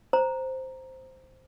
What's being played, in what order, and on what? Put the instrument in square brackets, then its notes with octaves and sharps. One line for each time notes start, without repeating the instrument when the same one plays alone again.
[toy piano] C5 A#5